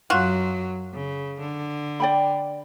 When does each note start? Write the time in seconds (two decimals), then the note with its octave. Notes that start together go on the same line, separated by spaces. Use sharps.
0.10 F#2 F#3 F4 F#4
0.93 C#3
1.39 D3
2.00 D5 G5 B5